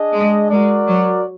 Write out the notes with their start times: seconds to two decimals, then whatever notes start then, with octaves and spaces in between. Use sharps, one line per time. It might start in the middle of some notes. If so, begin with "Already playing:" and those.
Already playing: D4 G#4 D#5
0.13 G#3
0.50 G#3 F#4 A#4 D5
0.87 F#3